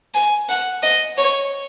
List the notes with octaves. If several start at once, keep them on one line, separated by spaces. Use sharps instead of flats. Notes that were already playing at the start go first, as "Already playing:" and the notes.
G#5
F#5
D#5
C#5